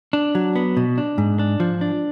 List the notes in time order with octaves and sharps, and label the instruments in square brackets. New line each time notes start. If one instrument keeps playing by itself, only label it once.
[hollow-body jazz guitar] D4
F#3
B3
B2
D4
G#2
D4
F3
D4